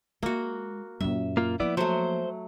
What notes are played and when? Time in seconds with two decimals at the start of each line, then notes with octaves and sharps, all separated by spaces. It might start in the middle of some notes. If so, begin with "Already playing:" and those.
0.23 G#3 A#3 F#4
1.00 F#2 A#2 E5
1.37 A#3 F4
1.60 F3 A#3 B3 E4 D5
1.77 F#3 A3 C5